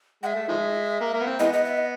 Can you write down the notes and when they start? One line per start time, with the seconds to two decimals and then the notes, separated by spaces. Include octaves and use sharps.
0.23 G#3 E5 F#5
0.35 A3
0.48 D#3 F3 G#3
1.01 A#3
1.13 A#3
1.20 B3
1.26 C4
1.39 E3 G#3 B3 D#5
1.53 D#5
1.64 E5
1.77 D#5